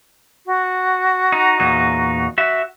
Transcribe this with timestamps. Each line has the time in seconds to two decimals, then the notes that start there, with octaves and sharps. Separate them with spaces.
0.46 F#4
1.32 D#4
1.60 E2 A#2 D#4
2.38 F#4 E5